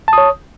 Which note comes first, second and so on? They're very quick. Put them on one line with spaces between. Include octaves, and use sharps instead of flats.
A5 D#6 C#5